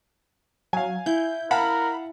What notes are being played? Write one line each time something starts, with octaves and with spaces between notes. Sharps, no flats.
F#3 F5 G#5
E4 G6
A#4 F5 F#5 A5 B5